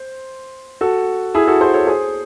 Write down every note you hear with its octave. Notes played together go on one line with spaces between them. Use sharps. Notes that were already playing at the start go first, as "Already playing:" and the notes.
Already playing: C5
F#4 A4
E4 G#4
F#4 A4
G#4 C5
A4 C#5
G#4 C5